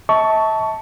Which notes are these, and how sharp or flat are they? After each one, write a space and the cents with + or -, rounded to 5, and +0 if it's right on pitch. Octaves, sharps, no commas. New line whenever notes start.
E5 -40 A5 +0 C#6 +15